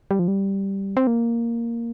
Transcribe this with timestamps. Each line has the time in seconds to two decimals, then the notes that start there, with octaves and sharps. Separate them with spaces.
0.11 G3
0.19 F3
0.28 G3
0.97 C4
1.07 A#3